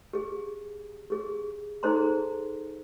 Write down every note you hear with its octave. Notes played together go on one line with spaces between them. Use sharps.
G4 G#4
G4 G#4
D#4 G#4 A4 C5 A#5 C6